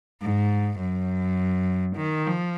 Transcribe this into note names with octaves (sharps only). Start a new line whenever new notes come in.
G#2
F#2
D#3
F3